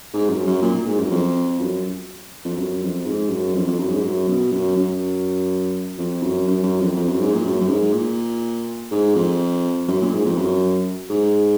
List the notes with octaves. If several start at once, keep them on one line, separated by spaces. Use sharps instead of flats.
G#2
F#2
F#2
A#2
A#2
G#2
F#2
F2
F#2
F2
F#2
F2
G#2
F#2
F2
F2
F#2
G#2
F#2
B2
F#2
F#2
F2
F#2
F#2
F#2
F2
F2
F#2
G#2
A#2
F#2
F#2
G#2
A#2
G#2
F2
F#2
A#2
G#2
F2
F#2
G#2